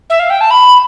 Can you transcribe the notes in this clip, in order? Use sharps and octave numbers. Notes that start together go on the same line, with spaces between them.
E5
F5
G5
A5
B5